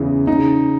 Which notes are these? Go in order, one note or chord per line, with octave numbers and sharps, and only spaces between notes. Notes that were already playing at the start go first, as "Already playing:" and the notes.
Already playing: E2 C#3 E3
C#3 D#4